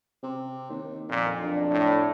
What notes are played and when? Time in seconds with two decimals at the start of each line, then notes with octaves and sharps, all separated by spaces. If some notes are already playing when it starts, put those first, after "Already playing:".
0.23 C3
0.70 D#2
1.09 F2 A#2
1.40 B1 D4
1.71 A2